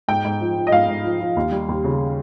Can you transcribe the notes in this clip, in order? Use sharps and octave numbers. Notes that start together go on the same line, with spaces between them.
G#2 G5
G#2
F3
F3
D#5
G#2 F5
G#2
F3
F3
D#2
G3
D#2
C#3